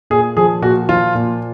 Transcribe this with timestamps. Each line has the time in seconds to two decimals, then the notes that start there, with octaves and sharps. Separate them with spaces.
0.10 A#2 G#4
0.37 F3 G#4
0.62 A#2 F#4
0.89 F3 F4
1.14 A#2